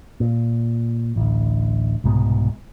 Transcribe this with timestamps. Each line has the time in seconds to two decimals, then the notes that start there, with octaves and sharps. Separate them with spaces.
0.20 A#2
1.16 A1 D2
2.04 C2 G#2 B2